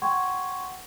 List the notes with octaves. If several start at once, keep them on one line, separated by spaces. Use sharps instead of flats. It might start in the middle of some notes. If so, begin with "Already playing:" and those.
F#5 G5 C6 C#6 G#6